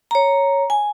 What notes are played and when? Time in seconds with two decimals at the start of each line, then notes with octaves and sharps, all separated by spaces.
0.11 C#5 A#5
0.70 G#5